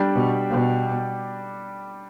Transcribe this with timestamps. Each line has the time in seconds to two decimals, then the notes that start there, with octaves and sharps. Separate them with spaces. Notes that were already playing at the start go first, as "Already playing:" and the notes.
Already playing: G3 D4 G4 D5
0.15 B2
0.50 B2